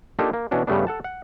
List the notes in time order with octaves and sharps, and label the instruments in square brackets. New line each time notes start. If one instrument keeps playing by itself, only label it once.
[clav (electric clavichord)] A#3 D4 D#4 F4 G4 A4
A#3
B2 E3 C#4 D4 F#4
G2 C#3 G3 A3 B3 D4
A4 F#5 A5
F#5